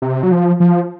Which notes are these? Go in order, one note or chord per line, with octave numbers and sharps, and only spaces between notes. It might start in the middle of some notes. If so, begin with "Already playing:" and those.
C3
F#3
F3
F3